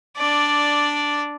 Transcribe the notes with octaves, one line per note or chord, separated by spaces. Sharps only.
D4 D5